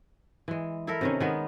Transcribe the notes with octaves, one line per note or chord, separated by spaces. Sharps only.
E3 G#3
E4 A4 A#4 E5
C3 D#3 C#4
D#3 G#3 B3